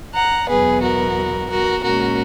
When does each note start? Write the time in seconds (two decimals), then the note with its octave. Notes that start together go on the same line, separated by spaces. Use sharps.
0.14 F#5 A#5
0.48 E2 B2 F#3 B3 G#4 B4
0.82 F#4 A#4
1.50 F#4 A#4
1.83 A#2 G#3 C#4 F#4 A#4